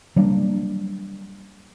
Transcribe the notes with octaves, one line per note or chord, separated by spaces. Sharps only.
F#3 G3 A#3 D4